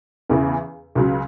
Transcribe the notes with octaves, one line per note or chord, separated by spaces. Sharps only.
E2 C#3 E3
C#2 C#3 F#3